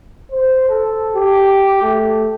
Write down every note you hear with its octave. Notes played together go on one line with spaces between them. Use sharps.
C5
A4
G4
A3